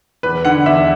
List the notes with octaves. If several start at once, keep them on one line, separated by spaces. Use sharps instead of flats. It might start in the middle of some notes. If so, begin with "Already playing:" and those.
E2 B4
D3 F#5
E2 E5